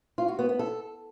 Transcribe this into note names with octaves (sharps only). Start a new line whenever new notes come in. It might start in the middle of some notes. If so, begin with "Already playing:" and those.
F4
F#4
B3
B3
A4